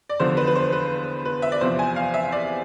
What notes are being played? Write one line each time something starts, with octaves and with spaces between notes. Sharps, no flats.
D5
E2 D3 F3 C5
B4
B4
C5
B4
B4
E5
D5
E2 C3 F3 C5
G#5
F5
E5
D5